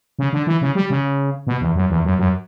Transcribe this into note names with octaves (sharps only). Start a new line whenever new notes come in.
C#3
D3
E3
C#3
G3
C#3
B2
E2
F#2
E2
F#2
F#2